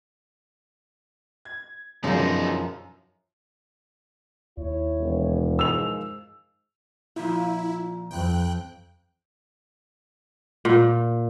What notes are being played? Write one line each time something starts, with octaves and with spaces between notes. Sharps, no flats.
G#6
F#2 B2 D3 E3 F3 G#3 D#4 C5
D#2 E4 C#5
E1
D#3 F3 G#3 E6 F7
A#2 F3 E4
F2 G5 F#6
A#2